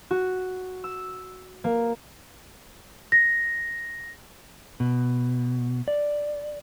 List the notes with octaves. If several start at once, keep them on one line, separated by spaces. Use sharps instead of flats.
F#4
E6
A#3
A#6
B2
D5